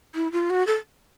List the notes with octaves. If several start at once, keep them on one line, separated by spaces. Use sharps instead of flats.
E4
F4
F#4
A4